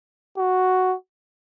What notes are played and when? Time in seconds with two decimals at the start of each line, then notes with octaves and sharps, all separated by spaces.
0.38 F#4